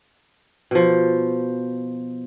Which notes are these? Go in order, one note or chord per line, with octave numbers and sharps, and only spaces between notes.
B2 F3